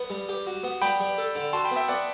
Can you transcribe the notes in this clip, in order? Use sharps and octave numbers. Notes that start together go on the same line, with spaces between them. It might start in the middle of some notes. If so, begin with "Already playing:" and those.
Already playing: B3
G3
G4
F#4
B3
G3 G5 B5
G3
A4
D3
F#4 A5 C6
G5 B5
B3
E5 G5
B3 D5 F#5